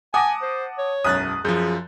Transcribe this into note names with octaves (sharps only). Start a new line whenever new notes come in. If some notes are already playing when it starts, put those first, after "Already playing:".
F#5 G#5 A5 D6 D#6 A#6
C5
C#5
E1 B1 F#2 D#6 F#6 A6
F#2 F3 G#4 G6